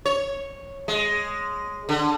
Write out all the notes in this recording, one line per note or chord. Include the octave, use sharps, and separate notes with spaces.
C#5
G#3
D3